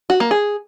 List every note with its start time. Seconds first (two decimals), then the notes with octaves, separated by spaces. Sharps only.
0.10 F#4
0.20 A#3
0.31 G#4